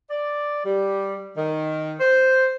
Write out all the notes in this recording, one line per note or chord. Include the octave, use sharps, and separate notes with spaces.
D5
G3
D#3
C5